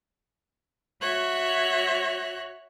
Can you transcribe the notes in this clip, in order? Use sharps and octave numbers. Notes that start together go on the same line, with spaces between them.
F#4 C#5 E5 F#6